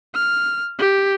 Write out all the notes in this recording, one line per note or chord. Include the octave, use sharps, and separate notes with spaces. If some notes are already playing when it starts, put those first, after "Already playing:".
F6
G4